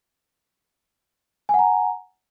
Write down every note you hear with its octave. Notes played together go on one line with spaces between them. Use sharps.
F#5 G#5 A#5